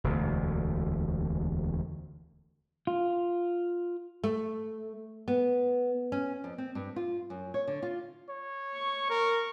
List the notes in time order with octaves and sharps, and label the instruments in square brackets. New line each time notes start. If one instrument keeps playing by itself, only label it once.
[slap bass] E1 D2
[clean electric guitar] F4
[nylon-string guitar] A3
B3
C#4
F2
C4
G2
F4
F#2
C#5
D3
F4
[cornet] C#5
[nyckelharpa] C#6
[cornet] A#4